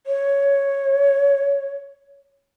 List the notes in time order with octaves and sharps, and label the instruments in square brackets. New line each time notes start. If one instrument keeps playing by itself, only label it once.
[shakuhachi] C#5